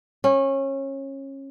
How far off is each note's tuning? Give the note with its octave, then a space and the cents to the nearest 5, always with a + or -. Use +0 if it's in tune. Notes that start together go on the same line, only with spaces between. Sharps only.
C#4 -25